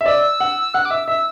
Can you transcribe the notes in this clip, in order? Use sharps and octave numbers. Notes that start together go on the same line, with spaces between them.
E5
D5 E6
F#5
F#5 F#6
D6
E5 E6
E5 E6